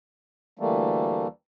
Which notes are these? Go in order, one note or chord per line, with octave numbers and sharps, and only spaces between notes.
D2 E3 G3 A3 A#3